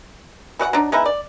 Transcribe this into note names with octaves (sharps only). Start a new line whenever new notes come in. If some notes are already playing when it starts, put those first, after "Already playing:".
E3 F#4 D5 F#5
F#3 D4 D#4
G#3 B3 D#4 E4
D5